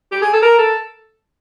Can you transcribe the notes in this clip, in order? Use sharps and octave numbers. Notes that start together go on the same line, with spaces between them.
G4
G#4
A4
A#4
A4